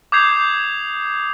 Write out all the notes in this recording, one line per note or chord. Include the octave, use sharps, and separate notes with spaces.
D6 D#6 G6 G#6 C7 F7